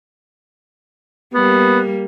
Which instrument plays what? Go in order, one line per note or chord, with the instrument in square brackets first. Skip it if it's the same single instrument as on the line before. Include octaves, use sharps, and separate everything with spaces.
[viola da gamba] G3 A#3 [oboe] B3